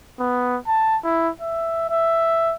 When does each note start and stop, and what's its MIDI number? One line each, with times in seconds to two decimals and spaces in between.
0.19 0.58 59
0.67 0.97 81
1.04 1.30 64
1.42 1.89 76
1.90 2.54 76